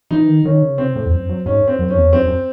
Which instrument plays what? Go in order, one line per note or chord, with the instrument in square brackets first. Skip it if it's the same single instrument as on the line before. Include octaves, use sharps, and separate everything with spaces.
[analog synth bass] E3 [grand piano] D#4
[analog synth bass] D#3
[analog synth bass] D#3 [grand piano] C#4
[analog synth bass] C#3
[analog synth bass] C3 [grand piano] C4
[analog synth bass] A2
E2
F#2
F#2
[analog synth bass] G#2 [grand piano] C#4
[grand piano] C4
[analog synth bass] F#2
[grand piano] C#4
[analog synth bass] E2
[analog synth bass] F#2 [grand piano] C4
[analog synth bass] F#2